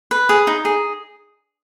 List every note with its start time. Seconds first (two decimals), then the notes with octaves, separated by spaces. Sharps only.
0.11 B4
0.29 G#4
0.47 D#4
0.65 G#4